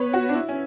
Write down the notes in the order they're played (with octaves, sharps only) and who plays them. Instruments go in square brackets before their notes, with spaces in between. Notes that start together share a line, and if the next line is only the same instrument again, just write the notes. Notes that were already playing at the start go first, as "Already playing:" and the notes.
Already playing: [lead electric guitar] B3 [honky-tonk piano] B4 C#5
[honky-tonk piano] F#4
D4
E4
C#4